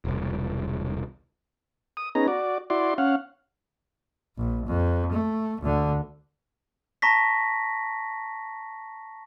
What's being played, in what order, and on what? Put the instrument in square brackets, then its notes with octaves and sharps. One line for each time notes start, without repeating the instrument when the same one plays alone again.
[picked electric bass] E1 C2
[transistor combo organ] D#6
B3 C#4 D#4 G#4 A#5
F#4 D5
E4 F#4 D5 C6
C#4 F5 F#5
[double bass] A#1
F2
A3
D2 D3
[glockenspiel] A5 A#5 C#6 A#6 B6